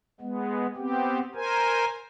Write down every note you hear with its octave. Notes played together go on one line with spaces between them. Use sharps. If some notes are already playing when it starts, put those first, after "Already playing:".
G#3 B3
B3 C4 G4
A#4 C5 G#5